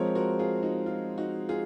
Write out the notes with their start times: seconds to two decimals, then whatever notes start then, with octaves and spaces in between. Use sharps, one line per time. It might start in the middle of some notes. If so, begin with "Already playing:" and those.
Already playing: F3 G#3 C4 A#4 C#5
0.15 F#4 A#4
0.39 F4 G#4
0.63 D#4 F#4
0.86 F4
1.18 D#4 F#4
1.49 F4 G#4